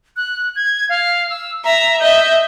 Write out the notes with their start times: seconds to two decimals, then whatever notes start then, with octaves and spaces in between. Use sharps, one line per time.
0.17 F#6
0.56 G#6
0.89 F5
1.30 E6
1.64 E5 A#5
2.00 D#5 E5 G6